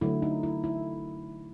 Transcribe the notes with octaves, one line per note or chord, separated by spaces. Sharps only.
D3 F#3 A3 E4
D#4
E4
E4